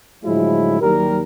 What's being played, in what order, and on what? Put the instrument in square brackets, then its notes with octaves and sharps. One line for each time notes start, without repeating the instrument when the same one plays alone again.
[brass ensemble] A2 D3 F3 F#3 G#3 E4
D#2 F#3 G3 G4 A#4